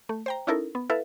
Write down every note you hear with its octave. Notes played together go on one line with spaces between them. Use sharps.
A3
C5 G5 A#5
C#4 D#4 E4 A4 A#4
B3
E4 A4 B4 E5 F5